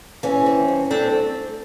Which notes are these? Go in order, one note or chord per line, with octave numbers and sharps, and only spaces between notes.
E3 C#4
C4
G2
A3 C4 D4